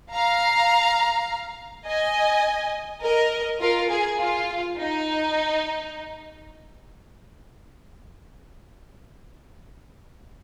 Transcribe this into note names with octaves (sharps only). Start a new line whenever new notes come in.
F5 A#5
D#5 G#5
A#4 D#5
F4 A#4
G#4
F4
D#4